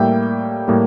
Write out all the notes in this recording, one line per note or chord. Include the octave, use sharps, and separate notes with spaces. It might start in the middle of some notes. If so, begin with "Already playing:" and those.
Already playing: A2 G3 A#3 E5 G5
A2 G3 A#3